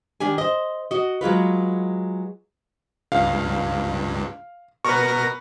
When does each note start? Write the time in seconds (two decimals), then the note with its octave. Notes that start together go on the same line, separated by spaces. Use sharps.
0.20 D#3 D4 G4 G#5
0.38 C5 D#5
0.91 F#4 D#5
1.21 F#3 G#3 F4 B4
3.12 C#2 G2 F5
4.85 B2 A#4 B4 C#6 A#6